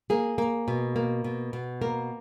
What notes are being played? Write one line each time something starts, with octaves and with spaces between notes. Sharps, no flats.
A#3 G#4
A#3
B2
A#3
B2
B2
A#3 A#4